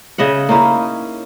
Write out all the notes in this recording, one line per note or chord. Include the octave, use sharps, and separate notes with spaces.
C#3 D#5 E5 F#5
A#3 C#4 D#4 E4